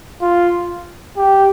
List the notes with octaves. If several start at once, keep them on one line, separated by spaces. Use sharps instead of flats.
F4
G4